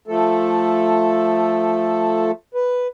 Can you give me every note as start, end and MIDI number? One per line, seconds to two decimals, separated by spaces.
0.08 2.31 53
0.08 2.31 57
0.08 2.31 69
2.55 2.87 71